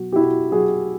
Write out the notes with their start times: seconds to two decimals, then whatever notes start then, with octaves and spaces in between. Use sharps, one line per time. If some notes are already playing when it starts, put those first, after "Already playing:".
Already playing: B2 F#3 F#4
0.12 G4
0.16 B2 E4 F#4
0.51 F#3 F#4 G#4